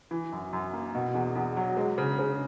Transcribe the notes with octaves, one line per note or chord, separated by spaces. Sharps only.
E3
F#2
F#2
A#3
B2
E2
E2
F#3
G#3
C#3
C#3